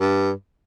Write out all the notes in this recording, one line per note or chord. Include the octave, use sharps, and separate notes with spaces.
G2